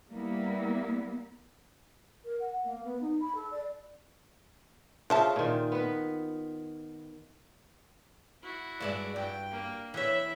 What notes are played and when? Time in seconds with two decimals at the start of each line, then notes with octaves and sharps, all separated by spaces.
0.10 G3 A#3 B3 E4
2.24 A#4
2.39 F#5
2.64 A#3
2.84 B3
3.00 D#4
3.20 B5
3.34 A4
3.51 D5
5.10 C#3 F3 F4 E5 A5
5.36 A#2 D#3
5.72 B3 B4
8.42 E4 F#4
8.80 G2 G#3 D5 E5
9.16 G2 G5
9.51 A#3
9.94 E3 E4 C#5 E5